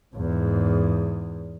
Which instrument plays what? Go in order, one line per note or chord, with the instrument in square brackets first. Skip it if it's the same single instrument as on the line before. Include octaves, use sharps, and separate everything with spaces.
[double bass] E2 G#2